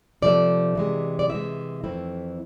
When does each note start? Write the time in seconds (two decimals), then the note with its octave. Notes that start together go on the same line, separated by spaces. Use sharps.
0.22 C3 F3 A3 D5
0.75 C3 E3 G#3
1.19 D5
1.30 C3 E3 G#3 E5
1.84 F2 E3 A3 C4 E4